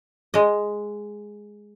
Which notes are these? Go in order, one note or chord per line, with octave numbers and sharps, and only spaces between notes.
G#3 D#5